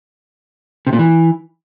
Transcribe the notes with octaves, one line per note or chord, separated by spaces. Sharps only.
C3
A#2
E3